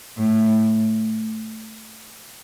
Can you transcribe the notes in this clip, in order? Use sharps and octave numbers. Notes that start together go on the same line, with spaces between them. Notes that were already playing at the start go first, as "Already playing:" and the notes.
A2